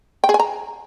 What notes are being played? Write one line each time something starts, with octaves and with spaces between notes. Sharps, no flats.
G5
G#4
G#5
A#5